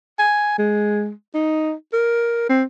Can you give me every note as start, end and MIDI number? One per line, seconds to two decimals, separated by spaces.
0.19 0.54 80
0.58 1.11 56
1.34 1.73 63
1.93 2.45 70
2.49 2.63 60